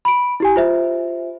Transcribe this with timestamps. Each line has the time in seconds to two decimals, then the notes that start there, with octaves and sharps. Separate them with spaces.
0.05 B5 D7
0.40 E4 G4 G#5
0.56 F4 C5 E5